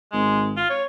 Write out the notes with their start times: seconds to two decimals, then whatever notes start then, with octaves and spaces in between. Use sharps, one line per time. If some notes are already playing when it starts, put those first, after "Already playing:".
0.13 G#1 G#3
0.57 F4
0.70 C#5